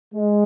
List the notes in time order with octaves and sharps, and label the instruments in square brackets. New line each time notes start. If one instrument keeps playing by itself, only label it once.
[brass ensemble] G#3